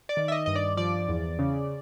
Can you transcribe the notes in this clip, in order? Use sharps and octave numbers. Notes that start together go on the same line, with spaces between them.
D5
D#3
E5
D#5
G2 D#5
D5
F3 D5
E2
C#3